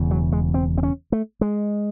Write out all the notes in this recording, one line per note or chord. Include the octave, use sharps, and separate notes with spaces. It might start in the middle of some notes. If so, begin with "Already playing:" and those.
Already playing: E1 E2 C#3
F#3
G#3
C4
C4
C#4
A3
G#3